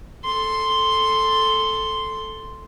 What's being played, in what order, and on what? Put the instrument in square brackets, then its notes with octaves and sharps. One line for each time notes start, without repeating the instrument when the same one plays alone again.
[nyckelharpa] A4 C6